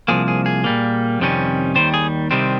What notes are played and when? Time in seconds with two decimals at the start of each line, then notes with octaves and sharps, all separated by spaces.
0.08 C2 A#2 F3 A#3 G#4
0.28 G#4
0.46 G#4
0.64 A#2 G3 A#3
1.20 F2 C3 D#3 G3 C#4
1.75 D#2 D#3 G3 C5
1.94 G#4
2.31 C2 C3 D#3 G3 C4